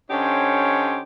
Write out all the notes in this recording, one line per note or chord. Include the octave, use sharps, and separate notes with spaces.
D3 C#4 D#4 G4 C5 C#5